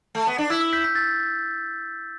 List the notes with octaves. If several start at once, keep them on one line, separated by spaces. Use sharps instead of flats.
A3
B3
D4
E4 E6
E6
G6 B6
G6 B6
E6 A6